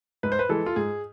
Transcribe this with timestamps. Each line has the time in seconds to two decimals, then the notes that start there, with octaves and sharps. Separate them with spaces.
0.23 G#2 B4
0.32 C5
0.39 B4
0.49 E3 G#3 A4
0.66 F4
0.76 G#2 G#4